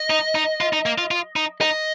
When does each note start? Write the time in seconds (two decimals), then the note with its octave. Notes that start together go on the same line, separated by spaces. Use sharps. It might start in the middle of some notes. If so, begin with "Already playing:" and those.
Already playing: D#5
0.10 D#4
0.35 D#4
0.61 F4
0.73 D#4
0.86 A#3
0.98 F4
1.11 F4
1.36 D#4
1.61 D#4 D#5